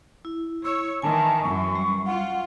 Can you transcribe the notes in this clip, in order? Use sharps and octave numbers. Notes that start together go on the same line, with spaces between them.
E4
C#5 E6
D#3 E3 G#5 A5
F#2 E3 C#6
G3
F4 F#5